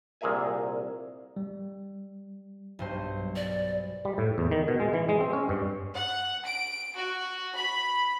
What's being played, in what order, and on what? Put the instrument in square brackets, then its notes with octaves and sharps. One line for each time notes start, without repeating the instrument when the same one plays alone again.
[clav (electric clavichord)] C2 A#2 G#4 A#4 E5 G#5
[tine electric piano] G3
[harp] B1 G2 C5
[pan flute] D5
[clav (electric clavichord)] G3
A2
E2
D#3
B2
G#3
E3
G#3
C4
C#4
G2
[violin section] F#5
D7
F#4
B5